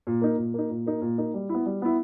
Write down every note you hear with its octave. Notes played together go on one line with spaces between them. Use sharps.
A#2
A#3 D#4
A#2
A#3 D#4
A#2
A#3 D#4
A#2
A#3 D#4
G3
B3 E4
G3
B3 E4